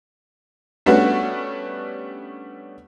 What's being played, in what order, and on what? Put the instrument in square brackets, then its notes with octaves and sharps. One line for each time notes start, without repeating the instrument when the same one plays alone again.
[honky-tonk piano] G3 A3 B3 C#4 D4 F#4